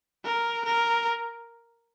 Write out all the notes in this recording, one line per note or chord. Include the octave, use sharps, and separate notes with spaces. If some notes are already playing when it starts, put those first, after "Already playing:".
A#4
A#4